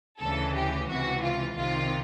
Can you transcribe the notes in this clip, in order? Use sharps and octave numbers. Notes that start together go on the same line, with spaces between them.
D2 C#3 E3 A4
G4
C#2 C3 E3 F#4
F4
C2 C3 D#3 F4